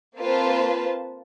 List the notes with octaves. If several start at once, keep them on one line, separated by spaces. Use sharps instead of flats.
A#3 C4 F4 B4 C5 A5